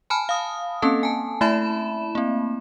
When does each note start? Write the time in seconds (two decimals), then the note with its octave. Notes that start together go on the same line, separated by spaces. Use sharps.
0.10 G#5 A5 B5 F6
0.29 F5 D#6
0.82 A#3 C4 C#4 A4 A5
1.03 G#5 A5
1.41 A3 E4 E5 A5 B5 E7
2.15 A#3 C4